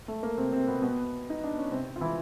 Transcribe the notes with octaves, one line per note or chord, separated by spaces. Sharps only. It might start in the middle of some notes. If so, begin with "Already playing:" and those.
A3
A#3
C3 C4
C3 C4
B2 B3
B2 B3
D#4
D4
C#4
C3 C4
F4
E3 E4